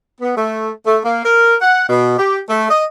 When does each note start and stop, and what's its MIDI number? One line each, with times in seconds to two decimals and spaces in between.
0.21 0.33 59
0.37 0.69 57
0.86 0.98 57
1.05 1.24 58
1.25 1.54 70
1.61 1.84 78
1.89 2.18 47
2.19 2.38 67
2.49 2.68 57
2.70 2.82 75